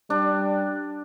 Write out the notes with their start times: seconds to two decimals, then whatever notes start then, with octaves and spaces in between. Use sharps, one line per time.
0.10 G3 D4